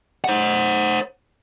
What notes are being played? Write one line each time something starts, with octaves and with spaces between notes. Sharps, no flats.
C5 F#5